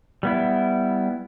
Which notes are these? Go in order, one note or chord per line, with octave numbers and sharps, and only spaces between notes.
G3 B3 E4